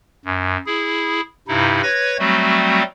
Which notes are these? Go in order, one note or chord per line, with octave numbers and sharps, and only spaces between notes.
F#2
E4 G#4
G2 C3 D#4 E4
B4 C#5 G#6 A#6
F#3 G3 A3 C4 F#4